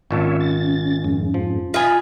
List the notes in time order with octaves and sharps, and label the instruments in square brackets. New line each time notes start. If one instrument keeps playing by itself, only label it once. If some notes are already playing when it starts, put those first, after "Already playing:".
[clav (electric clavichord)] G#1 A#2 A5 [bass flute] C#4 [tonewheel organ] C#5 E5
[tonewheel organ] A6
F2 G#2
[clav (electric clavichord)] F3
[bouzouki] F4 G#5 [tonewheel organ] D#5 B5